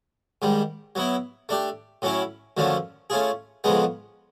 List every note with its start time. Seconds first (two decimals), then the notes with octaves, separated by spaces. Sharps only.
0.42 G#2 D#3 G3
0.95 F#3 B3 E4
1.49 A3 D4 G4
2.02 A2 F#3 A3 C#4 E4
2.57 F#2 D3 F3 A3 C#4
3.10 A3 C#4 F4 G#4
3.64 F2 C#3 F3 G#3 B3